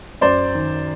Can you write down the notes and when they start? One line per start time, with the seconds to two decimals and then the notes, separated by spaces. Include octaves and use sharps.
0.21 F#2 C5 D5
0.54 D#3